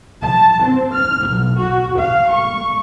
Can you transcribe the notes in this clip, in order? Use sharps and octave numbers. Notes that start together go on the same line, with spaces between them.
A5
C4
F6
B1
F#4
F5
C#6